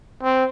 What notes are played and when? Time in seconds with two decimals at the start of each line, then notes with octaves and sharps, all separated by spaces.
0.23 C4